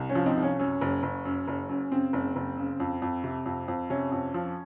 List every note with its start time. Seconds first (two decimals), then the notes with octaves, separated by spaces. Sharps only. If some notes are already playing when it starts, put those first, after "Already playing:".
Already playing: C2
0.09 C#4
0.15 F3
0.26 C4 D#4
0.37 C2
0.43 C#4
0.59 F#2 C#4
0.81 F#1
1.03 F#1
1.25 F#2
1.48 F#1
1.69 F#2
1.91 C#3 C4
2.13 F#1
2.36 F#1
2.57 C#3
2.80 F2
3.02 F2
3.24 C3
3.46 F2
3.68 F2
3.90 C3 C#4
4.12 F2
4.34 F3